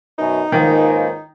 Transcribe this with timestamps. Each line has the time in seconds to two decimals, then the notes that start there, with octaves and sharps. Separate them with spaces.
0.18 F#2 B2 D#4
0.52 C#2 G#2 D#3 A#3